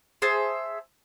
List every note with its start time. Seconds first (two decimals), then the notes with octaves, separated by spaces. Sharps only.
0.22 G#4 C5 E5 A5